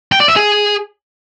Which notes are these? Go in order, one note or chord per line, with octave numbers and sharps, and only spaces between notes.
G5
D5
E5
G#4